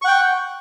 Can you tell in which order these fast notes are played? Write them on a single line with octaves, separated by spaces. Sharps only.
C#6 F#5 G5